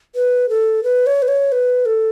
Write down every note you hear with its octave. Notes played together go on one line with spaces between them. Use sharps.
B4
A4
B4
C#5
B4
C#5
B4
A4